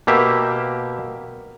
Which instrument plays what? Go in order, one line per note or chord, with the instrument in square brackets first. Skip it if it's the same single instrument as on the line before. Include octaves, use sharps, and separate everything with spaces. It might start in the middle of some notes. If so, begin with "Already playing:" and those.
[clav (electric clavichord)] B2 A#3 G4 E5